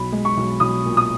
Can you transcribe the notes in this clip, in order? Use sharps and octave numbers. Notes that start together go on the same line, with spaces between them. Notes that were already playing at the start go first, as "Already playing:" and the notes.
Already playing: B1 B5
G#3
C#6
B1
B1 D#6
A#2
D#6